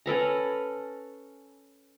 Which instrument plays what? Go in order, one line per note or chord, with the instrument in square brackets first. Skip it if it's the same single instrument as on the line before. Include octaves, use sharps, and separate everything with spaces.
[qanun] C#4 A4 B4 A#5